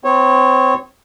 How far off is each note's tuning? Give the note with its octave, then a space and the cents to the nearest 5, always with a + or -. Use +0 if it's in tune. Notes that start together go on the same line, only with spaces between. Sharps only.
C4 -30 C#5 -20